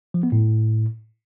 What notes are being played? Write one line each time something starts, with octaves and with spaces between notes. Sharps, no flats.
F3
B3
A2